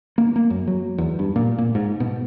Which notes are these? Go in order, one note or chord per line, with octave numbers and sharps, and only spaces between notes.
A#3
A#3
F#2
F#3
E2
G2
A#2
A#2
G#2
B2